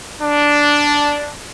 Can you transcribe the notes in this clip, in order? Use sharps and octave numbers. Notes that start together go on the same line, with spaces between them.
D4